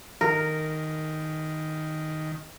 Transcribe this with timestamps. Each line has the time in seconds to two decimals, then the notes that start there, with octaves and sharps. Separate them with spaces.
0.21 D#3 A#4